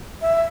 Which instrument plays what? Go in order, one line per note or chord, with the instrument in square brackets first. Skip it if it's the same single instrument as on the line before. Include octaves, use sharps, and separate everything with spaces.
[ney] E5